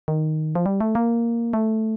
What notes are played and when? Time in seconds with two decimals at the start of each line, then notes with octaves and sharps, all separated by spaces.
0.08 D#3
0.55 F3
0.66 G3
0.81 A3
0.95 A#3
1.53 A3